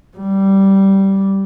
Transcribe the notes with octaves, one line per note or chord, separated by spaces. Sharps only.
G3